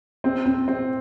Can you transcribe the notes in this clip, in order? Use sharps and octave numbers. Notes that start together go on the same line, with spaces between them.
C4
C4
C4